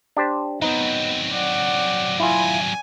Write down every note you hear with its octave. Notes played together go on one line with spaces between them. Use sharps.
D4 G4 C5
F#3 B3 C4 D#4
D5 F#5
E4 F4 G#5